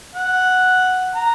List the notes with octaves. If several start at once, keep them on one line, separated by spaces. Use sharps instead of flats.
F#5
A#5